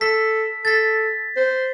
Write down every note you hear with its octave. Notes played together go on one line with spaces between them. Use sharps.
A4 B6
A4 A6 B6
C5